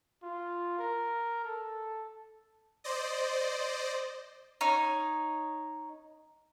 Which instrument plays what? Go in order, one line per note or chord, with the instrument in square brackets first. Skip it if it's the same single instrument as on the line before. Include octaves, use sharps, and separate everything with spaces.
[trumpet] F4
A#4
A4
[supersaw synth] C5 D5 D#5
[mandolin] D#4 C#5